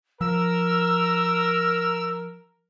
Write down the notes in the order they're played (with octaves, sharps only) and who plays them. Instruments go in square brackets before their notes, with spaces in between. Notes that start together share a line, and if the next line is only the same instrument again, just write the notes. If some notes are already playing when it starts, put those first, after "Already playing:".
[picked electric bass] F3 [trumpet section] A#4 [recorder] E6